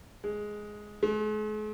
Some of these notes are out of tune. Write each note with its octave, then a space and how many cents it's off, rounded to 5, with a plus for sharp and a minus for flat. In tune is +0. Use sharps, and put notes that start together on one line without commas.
G#3 +5
G#3 +45